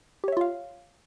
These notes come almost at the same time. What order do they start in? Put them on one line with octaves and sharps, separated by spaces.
G4 C#5 E5 F4 F5